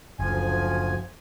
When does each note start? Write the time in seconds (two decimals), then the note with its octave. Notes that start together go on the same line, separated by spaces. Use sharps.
0.19 F#1 D2 F3 G#5